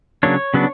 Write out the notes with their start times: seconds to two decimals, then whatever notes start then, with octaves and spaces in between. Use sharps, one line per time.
0.23 C#3 F#3 A#3 D4 C#5
0.54 C#3 F#3 B3 D4